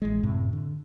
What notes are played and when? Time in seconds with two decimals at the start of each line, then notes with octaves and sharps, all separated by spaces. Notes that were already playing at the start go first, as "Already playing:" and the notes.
0.02 A1 G#3
0.23 F#2 A2 C3
0.53 D3